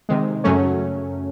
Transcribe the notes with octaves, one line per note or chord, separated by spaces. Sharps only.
C3 D#3 G#3
F#2 C#3 F#3 A3 C#4